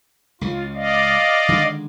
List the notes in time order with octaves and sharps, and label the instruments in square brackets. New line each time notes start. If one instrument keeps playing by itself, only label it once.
[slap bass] C#2 C#3 [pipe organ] F4
[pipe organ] D5 D#5 F5
[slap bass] D3 D#3 G#3